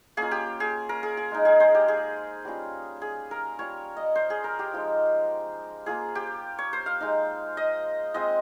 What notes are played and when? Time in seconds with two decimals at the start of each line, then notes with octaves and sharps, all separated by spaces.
0.17 A#3 C#4 F4 G#4
0.31 G4
0.60 G#4
0.89 A#4
1.03 G#4
1.17 G#4
1.31 G#3 D#4
1.45 G#4
1.60 C5
1.75 G4
1.88 G#4
2.45 G3 C#4 F4
3.02 G#4
3.31 A#4
3.59 G3 C#4 F4 C#5
3.96 D#5
4.15 C5
4.30 G#4
4.44 A#4
4.59 G4
4.73 F3 G#3 D#4
5.86 A#3 F4 G#4
6.15 G4
6.59 C#5
6.73 C5
6.86 F5
7.00 G#3 D#4
7.57 D#5
8.14 G#3 C4 F4 D#5